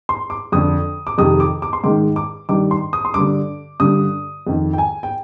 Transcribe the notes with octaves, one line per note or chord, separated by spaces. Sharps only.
C6
D6
F2 D3 D#6
D6
F2 C3 D#3 D#6
D6
D6
C6
G#2 D#3 D6
D6
G2 D#3 D6
C6
D#6
C6
G2 D3 D6
G2 D3 D#6
F2 D#3
G5
G#5
G5